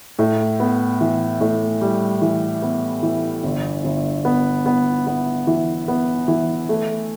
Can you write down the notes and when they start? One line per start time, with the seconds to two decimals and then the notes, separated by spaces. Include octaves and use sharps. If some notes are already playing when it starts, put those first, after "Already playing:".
0.19 A2
0.60 B3
1.01 E3
1.41 A2
1.81 G3
2.22 E3
2.62 B3
3.03 E3
3.44 G1
3.84 G1
4.25 B3
4.66 B3
5.07 B3
5.47 E3
5.88 B3
6.28 E3
6.69 A3